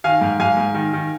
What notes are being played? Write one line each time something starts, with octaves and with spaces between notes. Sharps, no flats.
D#3 F5 G#5
G#2
G#2 F5 G#5
G#2
D#3
D#3